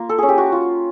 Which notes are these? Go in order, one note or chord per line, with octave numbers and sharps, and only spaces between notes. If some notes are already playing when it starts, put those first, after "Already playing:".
Already playing: A#3 F4
A4
C#4 G#4
G4
F#4
F4